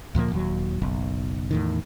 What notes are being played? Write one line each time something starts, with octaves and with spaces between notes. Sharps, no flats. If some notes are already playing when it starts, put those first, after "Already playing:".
D2 A#2 F3 A#3
D#1 D#2 F#3
F#1 B1
E2 A2 D#3